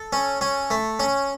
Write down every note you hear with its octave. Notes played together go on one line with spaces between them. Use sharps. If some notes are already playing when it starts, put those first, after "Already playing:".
Already playing: A4
C#4
C#4
A3
C#4